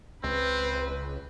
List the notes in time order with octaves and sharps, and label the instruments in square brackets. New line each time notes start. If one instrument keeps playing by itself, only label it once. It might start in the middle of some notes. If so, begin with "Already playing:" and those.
[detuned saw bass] C#2 [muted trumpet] C4 [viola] B4